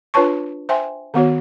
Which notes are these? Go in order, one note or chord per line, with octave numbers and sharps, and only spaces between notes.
D4 F4 B4 C#5 A5 C#6
C5 E5 G5 G#5 C6
D#3 B3 F#4 C#5